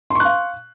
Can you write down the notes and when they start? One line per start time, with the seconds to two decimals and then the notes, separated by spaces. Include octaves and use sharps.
0.10 C6
0.15 C#6
0.20 F#6
0.25 F5